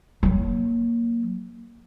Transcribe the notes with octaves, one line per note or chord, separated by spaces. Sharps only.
F#3 A#3